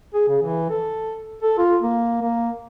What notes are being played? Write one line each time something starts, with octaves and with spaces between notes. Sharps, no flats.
G#4
C#3
E3
A4
A4
F4
A#3
A#3